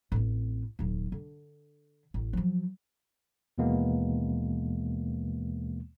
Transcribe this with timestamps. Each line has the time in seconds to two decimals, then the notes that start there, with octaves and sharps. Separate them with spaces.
0.12 A1 C4
0.79 D#1 F#3
1.12 D3
2.14 A1
2.33 F3 F#3
3.58 D#2 B2 E3 G#3 A#3 B3